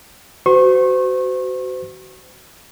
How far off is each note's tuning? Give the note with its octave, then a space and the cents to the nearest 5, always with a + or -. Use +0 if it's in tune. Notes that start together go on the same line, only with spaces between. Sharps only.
F#4 +20 C5 -40 C#6 -35